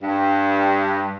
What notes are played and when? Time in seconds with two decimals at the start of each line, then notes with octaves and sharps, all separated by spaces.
0.03 G2